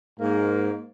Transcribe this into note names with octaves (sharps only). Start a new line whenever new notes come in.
G#2 A#3